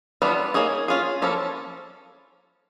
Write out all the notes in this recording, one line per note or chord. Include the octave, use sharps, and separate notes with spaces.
E3 G3 B3 D4 F4
A#3 D#4 G#4 C#5
C#4 F4 G#4
F3 A#3 C#4 E4 A4